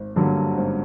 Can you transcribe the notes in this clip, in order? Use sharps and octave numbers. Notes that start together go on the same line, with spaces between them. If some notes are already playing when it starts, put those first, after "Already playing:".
Already playing: G#1
G2 D3 F#3 A#3
G#1